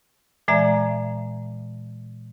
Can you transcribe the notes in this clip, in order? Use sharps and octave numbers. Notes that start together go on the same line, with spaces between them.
A#2 E3 G#3 D5 E5 A#5